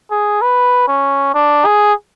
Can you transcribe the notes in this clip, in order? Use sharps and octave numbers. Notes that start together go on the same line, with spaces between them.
G#4
B4
C#4
D4
G#4